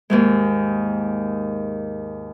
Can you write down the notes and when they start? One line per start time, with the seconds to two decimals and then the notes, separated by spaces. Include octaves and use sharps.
0.10 D#2 G#2 G#3